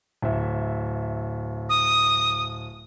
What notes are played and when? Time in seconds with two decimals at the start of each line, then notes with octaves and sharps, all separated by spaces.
0.22 D1 E5
1.69 D#6